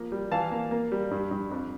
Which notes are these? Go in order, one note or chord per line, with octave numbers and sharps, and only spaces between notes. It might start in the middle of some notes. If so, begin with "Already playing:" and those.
Already playing: F3 A#3
G3
E3 F5 A5
A#3
A#3
G3
G2
G2
F2